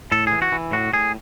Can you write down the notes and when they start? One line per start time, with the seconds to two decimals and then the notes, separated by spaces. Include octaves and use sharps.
0.12 A2 A4
0.27 E3 G#4
0.42 F#4
0.52 E3
0.72 A2 F#4
0.93 A2 G#4